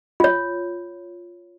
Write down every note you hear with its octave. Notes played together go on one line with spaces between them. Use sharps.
F4 C#5